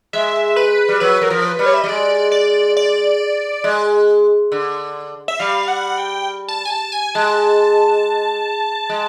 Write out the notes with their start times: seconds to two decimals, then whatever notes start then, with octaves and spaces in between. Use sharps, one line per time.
0.13 G#3 E5
0.56 B4
0.89 G3
1.00 F#3 B4
1.21 F#3 A#4
1.30 F3
1.45 B4
1.59 G3
1.66 C#5
1.74 E5
1.81 G3 D#5
1.88 G#3 D5
2.32 D5
2.77 D5
3.64 G#3
4.52 D3
5.28 E5
5.39 G3 F5
5.68 F#5
5.98 G5
6.48 A5
6.65 G#5
6.70 A5
6.92 G#5
7.15 G#3 A5
8.90 G#3